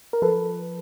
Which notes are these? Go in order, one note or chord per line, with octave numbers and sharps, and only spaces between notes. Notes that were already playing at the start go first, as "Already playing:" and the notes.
A#4
F3 A4 B4